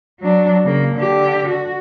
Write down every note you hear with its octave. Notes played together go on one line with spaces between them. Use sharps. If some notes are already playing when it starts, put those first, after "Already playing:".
F#3 D4
C#3 A#3
D3 G4
F#4